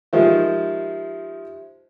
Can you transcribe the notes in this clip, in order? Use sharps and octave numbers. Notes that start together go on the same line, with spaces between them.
D#3 F3 G#3 G4 C5 E5